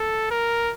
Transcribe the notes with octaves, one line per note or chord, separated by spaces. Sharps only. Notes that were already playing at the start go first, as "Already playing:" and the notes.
Already playing: A4
A#4